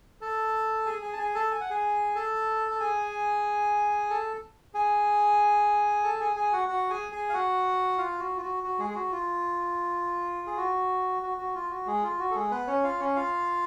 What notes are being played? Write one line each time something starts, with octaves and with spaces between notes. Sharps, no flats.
A4 A5
G#4 G#5
G#4 G#5
A5
G#4 G#5
A4 A5
G#5
F#5
G#4 G#5
A4 A5
A5
G#4 G#5
A4 A5
G#4 G#5
A4 A5
G#4 G#5
G#4 G#5
F#4 F#5
F#4 F#5
G#4 G#5
G#4 G#5
F5
F#4 F#5
F4 F5
F#4
F4
F#4
F#4
G#3 G#4
G#4
F#4
F4
G#4
F#4
F#4
F#4
F4
F#4
G#3 G#4
F4
F#4
A4
G#3 G#4
B3 B4
C#4 C#5
F4 F5
C#4 C#5
F4 F5